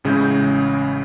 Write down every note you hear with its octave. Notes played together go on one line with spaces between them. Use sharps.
A1 C#3 G#3 C#4 E4 G6